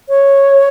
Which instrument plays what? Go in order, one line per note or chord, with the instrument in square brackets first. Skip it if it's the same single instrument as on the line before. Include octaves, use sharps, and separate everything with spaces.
[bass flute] C#5